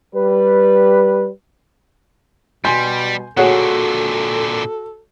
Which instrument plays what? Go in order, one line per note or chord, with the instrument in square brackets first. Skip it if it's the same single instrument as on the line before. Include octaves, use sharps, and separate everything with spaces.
[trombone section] G3 B4
[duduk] B2 [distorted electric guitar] G3 [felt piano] G#5 C6 G6
[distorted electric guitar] A#2 D3 [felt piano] F#4 [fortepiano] G#4 C#5 F#5 [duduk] A4